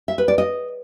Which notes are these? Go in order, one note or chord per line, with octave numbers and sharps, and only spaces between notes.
E5
B4
D5
D#5